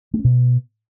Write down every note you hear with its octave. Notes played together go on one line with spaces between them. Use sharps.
A3
C#4
B2